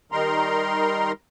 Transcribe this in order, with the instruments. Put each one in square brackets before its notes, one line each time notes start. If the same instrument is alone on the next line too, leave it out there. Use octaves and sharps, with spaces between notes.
[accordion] D#3 G3 D#4 A#4 A#5 C6